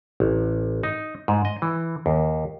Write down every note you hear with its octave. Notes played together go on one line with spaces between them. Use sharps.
A1
D#4
G#2
D#5
E3
D#2